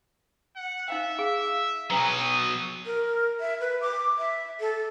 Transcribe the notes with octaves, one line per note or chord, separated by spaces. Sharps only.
F#5
D#4 E5 F5 G5
G#4 F5
B2 F#3 D4 B4 A#5 D#6
A#4
E5
B4
D6
E5
A4